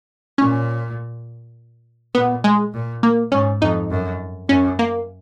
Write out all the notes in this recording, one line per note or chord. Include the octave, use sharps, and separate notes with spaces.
A#2 C#4
A#2 B3
G#3
A#2
A#3
G#2 C#4
F2 D#4
F#2
F#2 C#4
A#3